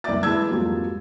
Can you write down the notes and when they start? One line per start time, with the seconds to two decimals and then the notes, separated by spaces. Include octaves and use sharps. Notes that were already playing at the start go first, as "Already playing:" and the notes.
0.04 F#1 C2 D5 E5 D6 A6
0.23 E3 G#3 A5 E6 G#6
0.49 F2 G#2 F#3 G3 A#3